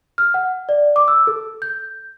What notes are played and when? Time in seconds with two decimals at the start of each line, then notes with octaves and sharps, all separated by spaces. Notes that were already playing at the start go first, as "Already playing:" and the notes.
0.18 F6
0.34 F#5
0.69 D5
0.96 D6
1.08 E6
1.27 A4
1.62 G6